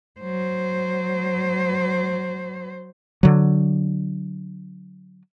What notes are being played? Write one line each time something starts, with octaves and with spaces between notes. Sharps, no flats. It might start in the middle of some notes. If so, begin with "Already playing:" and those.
F#3 C5
D3 F#3